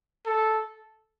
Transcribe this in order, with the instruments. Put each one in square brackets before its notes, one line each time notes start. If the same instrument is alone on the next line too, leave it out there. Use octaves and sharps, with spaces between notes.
[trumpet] A4